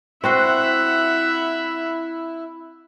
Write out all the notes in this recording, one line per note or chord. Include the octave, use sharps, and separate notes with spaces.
C4 E4 F#4 C5 E5 F#5